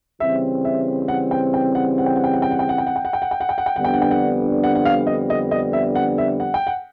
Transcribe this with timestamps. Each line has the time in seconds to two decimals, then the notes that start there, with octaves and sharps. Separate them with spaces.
0.20 C#3 E3 G3 C4 E5
0.65 E5
1.08 F#5
1.31 G5
1.54 G5
1.75 F#5
1.98 F#5
2.06 G5
2.16 F#5
2.24 G5
2.33 F#5
2.42 G5
2.51 F#5
2.59 G5
2.69 F#5
2.78 G5
2.87 F#5
2.96 G5
3.05 F#5
3.13 G5
3.22 F#5
3.31 G5
3.40 F#5
3.49 G5
3.58 F#5
3.66 G5
3.74 F2 D3 G3 B3 D4 F#5
3.84 G5
3.93 F#5
4.02 G5
4.11 F#5
4.64 F#5
4.75 F#5
4.85 F5
5.07 D#5
5.30 D#5
5.51 D#5
5.73 E5
5.95 F#5
6.18 E5
6.40 F#5
6.54 G5
6.67 F#5